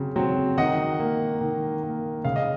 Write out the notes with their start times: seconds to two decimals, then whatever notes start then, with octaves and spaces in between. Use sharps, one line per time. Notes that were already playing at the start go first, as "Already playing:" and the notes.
Already playing: C#3 F#3 C4
0.16 F#3 C4
0.58 D#3 D#5 F#5
0.99 A#3
1.41 D#3
1.83 A#3
2.24 C#3 F5
2.36 D#5